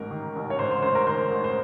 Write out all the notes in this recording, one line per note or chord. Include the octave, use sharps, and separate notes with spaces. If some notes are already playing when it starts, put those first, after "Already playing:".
Already playing: A1 G#2 A#4
D#3
A1
C#5
G#2 C5
C5
A1 C5
A#4
D#3 C5
A1
C5